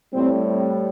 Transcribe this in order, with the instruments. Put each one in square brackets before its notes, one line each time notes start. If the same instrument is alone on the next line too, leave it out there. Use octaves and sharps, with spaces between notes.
[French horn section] A2 G3 C4